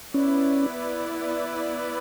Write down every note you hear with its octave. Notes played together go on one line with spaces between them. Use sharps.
B3 C#4 E4 B4 D5